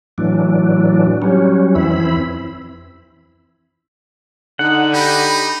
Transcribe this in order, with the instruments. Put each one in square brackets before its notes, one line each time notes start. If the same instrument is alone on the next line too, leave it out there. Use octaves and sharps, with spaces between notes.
[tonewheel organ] A2 E3 F#3 D4
F#3 G3 C#4
F2 E3 C4 E4 B5
[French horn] D3 [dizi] D#4 [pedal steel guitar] F#5
[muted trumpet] D#4 [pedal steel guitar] G4 [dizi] B5